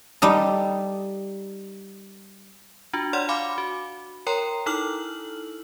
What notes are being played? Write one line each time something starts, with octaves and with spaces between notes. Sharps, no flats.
G3 D#4 A4
D4 F4 F#4
C#5 D5 F#5 C6 F6
F5 G#5 B5 C6 D6
F#4
A#4 C#5 G5 A#5 C6
D#4 E4 A4 E6 F6 F#7